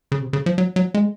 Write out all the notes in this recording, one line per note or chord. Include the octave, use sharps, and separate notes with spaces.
C#3
C3
C#3
F3
F#3
F#3
G#3